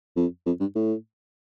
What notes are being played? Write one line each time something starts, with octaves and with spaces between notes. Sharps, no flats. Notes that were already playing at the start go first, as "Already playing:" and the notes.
F2
F2
G2
A2